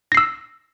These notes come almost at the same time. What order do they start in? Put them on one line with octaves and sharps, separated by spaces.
A#6 C7 E6